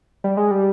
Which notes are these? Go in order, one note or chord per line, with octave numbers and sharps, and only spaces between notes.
G3
G#3
G3